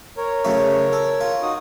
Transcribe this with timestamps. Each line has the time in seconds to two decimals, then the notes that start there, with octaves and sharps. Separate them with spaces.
0.17 A#4 C#5
0.45 C#3 F#3 A3
0.93 A4
1.21 F4
1.42 D#4 F#4 D#6